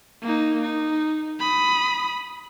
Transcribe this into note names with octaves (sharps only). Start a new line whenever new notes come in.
A#3 D#4
D#4
B5 D#6